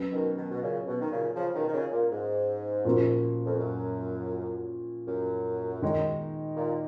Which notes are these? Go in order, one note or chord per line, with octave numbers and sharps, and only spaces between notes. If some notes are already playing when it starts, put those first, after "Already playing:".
Already playing: F#3 C#4 F#4 B4
B2 D#3
B2 D#3
B2
A#2 C#3
B2
D#3
A#2 C#3
C#3 F3
B2 D#3
D#3
A#2 C#3
A#2
G#2
A#2 F3 A#3 C#4 F#4
F2
F#2
F#2
D#3 G#3 D#4
A#2